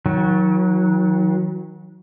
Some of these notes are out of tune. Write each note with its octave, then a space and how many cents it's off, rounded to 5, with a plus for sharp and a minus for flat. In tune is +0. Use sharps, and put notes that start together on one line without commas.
D#3 +35 F#3 -15